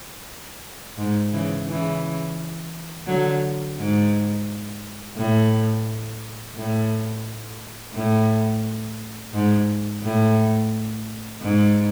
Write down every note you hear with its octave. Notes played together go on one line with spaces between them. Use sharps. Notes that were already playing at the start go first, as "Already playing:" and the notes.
G#2
C#3 E3
C#3 E3
D3 F#3
G#2
A2
A2
A2
G#2
A2
G#2